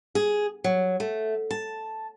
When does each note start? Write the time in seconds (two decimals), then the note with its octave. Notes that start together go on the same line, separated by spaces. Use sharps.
0.15 G#4
0.64 F#3
1.00 A3
1.51 A5